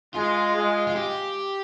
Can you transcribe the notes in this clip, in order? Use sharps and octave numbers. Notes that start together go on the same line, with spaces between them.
G#3 F4
G#3
F4
G4